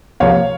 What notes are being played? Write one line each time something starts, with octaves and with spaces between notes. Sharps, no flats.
C#2 C3 F3 A#3 C#5 F5